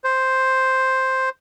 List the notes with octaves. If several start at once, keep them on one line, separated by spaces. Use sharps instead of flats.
C5